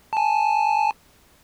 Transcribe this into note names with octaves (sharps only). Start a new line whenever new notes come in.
G#5 A5